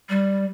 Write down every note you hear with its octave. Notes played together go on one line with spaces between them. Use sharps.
G3